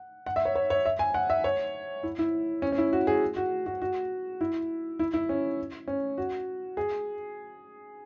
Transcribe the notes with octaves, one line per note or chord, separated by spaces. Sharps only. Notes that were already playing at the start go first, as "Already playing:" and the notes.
Already playing: F#5
F#5
E5
C#5
C#5
C#5
E5
G#5
F#5
E5
C#5
E4
E4
C#4
C#4
E4
F#4
G#4
F#4
F#4
F#4
E4
E4
E4
C#4
C#4
F#4
G#4